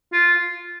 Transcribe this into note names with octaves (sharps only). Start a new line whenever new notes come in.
F4